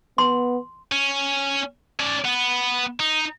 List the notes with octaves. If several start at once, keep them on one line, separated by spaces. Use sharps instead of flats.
B3 C6
C#4
C#4 D5
B3
D#4